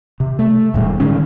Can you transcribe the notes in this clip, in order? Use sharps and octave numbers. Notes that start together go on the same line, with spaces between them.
C3
A3
D#1 A2 G3 A3
D3 D#3 G#3 C#4